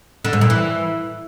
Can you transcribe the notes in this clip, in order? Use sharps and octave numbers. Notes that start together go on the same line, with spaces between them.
D3
G#2
A#2
E3